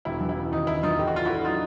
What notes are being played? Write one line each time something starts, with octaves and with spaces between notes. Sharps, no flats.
E1 E4
E3
E4
C#3
D#2 D#4
E1 E4
E3 D#4 F4
A2 G4
F#4
D4 F4
A3 E4 F#4
F#3 D#4 F4